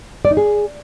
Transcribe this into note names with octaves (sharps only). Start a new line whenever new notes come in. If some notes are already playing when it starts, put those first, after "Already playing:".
D5
D#4
G#4